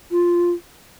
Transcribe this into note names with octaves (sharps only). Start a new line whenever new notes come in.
F4